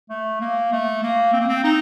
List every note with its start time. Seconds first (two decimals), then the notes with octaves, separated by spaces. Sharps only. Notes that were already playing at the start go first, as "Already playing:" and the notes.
0.10 A3
0.41 A#3
0.72 A3
1.03 A#3
1.33 C4
1.41 A#3
1.48 C4
1.64 D#4